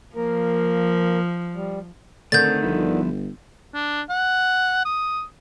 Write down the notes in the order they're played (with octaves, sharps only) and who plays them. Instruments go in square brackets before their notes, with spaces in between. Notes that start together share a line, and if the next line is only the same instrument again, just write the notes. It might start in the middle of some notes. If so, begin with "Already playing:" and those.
[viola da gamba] F3 [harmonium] A#3 A#4
[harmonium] G3
[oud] D3 D#3 [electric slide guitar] A3 C4 D4 [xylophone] G6 A6
[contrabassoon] G1 [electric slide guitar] F3 B3 E4
[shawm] D4
F#5
D#6